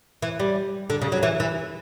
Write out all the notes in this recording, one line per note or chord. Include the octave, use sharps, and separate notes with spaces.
E3
G3
D3
C#3
F#3
E3
E3